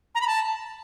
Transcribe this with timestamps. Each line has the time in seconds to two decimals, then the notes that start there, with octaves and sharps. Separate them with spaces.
0.15 A#5
0.21 B5
0.27 A5